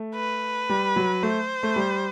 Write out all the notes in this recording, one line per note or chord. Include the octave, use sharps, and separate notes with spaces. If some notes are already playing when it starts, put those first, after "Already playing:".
Already playing: A3
B4
G3
F#3
A3 C5
A3
G3